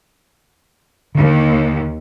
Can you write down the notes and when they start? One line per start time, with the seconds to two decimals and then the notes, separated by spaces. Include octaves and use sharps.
1.15 D#2 D3